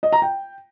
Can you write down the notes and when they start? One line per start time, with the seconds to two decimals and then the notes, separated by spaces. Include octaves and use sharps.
0.03 D#5
0.12 A#5
0.22 G5